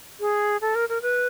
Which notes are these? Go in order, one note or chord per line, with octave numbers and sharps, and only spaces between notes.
G#4
A4
A#4
A#4
B4